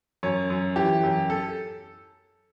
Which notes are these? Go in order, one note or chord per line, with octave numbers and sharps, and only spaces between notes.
F#2 C#5
F#2
E3 G4
F#2
A4